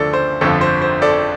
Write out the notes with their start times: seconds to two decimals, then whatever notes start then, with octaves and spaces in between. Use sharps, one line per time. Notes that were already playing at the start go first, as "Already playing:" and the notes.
Already playing: D2 D3 F3 A4 D5
0.13 C5
0.41 G1 F2 D3 F3 A4
0.61 C5
0.82 C5
1.02 A4 D5